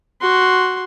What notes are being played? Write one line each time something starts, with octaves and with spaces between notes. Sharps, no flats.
F#4 C6